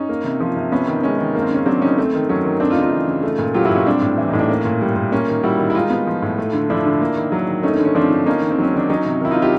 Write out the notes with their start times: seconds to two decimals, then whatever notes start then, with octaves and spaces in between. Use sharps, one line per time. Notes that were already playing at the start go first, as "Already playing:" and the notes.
Already playing: C#4 D#4
0.09 A#3
0.24 C3
0.40 F3
0.56 C3
0.72 B3 C#4
0.87 D#3
1.03 G#3 C#4
1.18 D#3
1.35 A#3
1.42 C4
1.51 C#3 C#4
1.66 F#3 C4 D4
1.82 C#3 C#4 D#4
1.98 A3 C4
2.14 D#3
2.29 F#3 C#4
2.45 D#3
2.60 A3 C4 D4
2.70 D#4 F4
2.76 C#3
2.81 D#4 F4
2.91 E3
3.08 C#3
3.23 A3
3.39 A#2
3.54 F#3 F4 G4
3.65 E4 F#4
3.71 A#2
3.76 C#4
3.86 G3 C4 D4
4.01 A2
4.18 E3
4.29 A2 D#4
4.39 D4
4.49 A#3 C#4
4.65 A#2
4.81 G3
4.96 A#2
5.12 A#3 C#4
5.28 D#3
5.43 G3 E4 F#4
5.59 D#3
5.70 E4
5.75 G#3 D#4 F4
5.90 B3
6.07 F3
6.22 A2
6.38 A3
6.53 D3
6.70 F3 D4 E4
6.86 D3
7.01 A#3
7.17 D#3
7.32 F#3
7.47 D#3
7.63 A3 C#4 D#4
7.74 C#4
7.79 D3
7.85 C#4
7.95 F3 C4 D4
8.10 D3
8.26 A#3 C#4 D#4
8.42 D#3
8.51 C4
8.58 F#3 C#4
8.73 D#3 D4
8.89 F#3 C#4 D#4
9.06 C3
9.21 D#3 E4
9.31 D#4 F4
9.36 C3
9.42 F4 G4